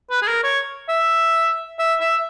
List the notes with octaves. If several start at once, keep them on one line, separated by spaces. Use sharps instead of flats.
B4
G#4
A#4
C#5
E5
E5
E5